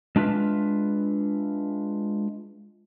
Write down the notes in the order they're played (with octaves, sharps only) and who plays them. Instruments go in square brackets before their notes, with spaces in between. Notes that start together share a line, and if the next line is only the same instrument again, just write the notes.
[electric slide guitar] G#3 D4 F4 B4 E5